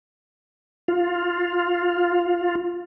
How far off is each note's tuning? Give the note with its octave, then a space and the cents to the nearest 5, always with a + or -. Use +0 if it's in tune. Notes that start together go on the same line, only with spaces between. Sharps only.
F4 +10